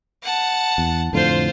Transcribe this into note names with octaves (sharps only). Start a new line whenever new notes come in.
F#5 A5
E2
F2 A2 D3 F4 C5